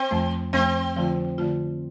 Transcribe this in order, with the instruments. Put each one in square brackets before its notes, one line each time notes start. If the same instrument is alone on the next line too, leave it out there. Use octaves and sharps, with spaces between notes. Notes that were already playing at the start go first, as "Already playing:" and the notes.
Already playing: [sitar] C4
[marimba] F2 F3 A3
[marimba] F2 F3 A3 [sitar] C4
[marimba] D3 F3 A3 F4
D3 F3 A3 F4